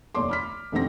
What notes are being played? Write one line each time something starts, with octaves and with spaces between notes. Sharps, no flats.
F1 D#2 C#5 D5 C6 D6
B5 F6 B6
F1 D3 D#3 A3 C4 A#6